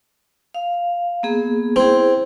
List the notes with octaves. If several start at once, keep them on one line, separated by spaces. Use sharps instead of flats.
F5
A#3 B3 G#4
C4 E4 G#4